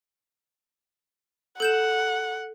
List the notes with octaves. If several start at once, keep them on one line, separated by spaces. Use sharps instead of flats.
A4 F#5 G6 E7